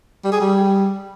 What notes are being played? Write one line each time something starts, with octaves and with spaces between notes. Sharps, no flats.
G3
G#4
G3